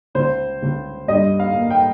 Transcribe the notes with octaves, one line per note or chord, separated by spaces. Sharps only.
C#2 C5
C#2
G2 D#5
F5
A#3
G5